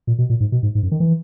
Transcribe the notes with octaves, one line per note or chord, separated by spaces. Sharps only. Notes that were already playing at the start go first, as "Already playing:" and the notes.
A#2
B2
A#2
G#2
B2
G#2
G#2
F#2
D#3
E3